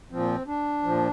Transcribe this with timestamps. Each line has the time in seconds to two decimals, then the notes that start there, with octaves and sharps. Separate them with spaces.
0.11 A#2 F3 C4
0.47 D4
0.83 A#2 F3